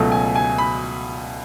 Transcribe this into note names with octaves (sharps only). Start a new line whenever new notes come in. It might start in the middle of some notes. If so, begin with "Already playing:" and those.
Already playing: C#2 B2 F#3 A3
G#5
G#5
B5